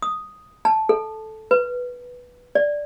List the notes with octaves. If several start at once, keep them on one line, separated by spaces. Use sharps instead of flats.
D#6
A5
A4
B4
D5